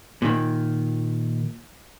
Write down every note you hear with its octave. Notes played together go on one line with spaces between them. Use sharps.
A#2 D#3